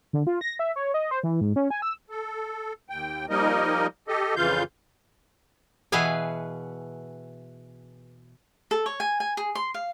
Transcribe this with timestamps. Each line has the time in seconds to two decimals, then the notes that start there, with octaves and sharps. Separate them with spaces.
0.13 D3
0.27 F4
0.41 A#6
0.59 E5
0.76 C#5
0.94 D#5
1.11 C5
1.24 E3
1.41 G#2
1.56 C#4
1.71 G#5
1.82 E6
2.10 A4
2.89 D#2 G5
3.29 F3 G3 A#3 D#4 A#4 D#5
4.08 G4 A4 D#5
4.36 F2 C#3 E3 F4 F5 G6
5.92 B2 E3 G#4 B4 F5 G#5
8.71 A4
8.86 C#5
9.00 G#5
9.20 G#5
9.37 G#4
9.55 C6
9.74 F5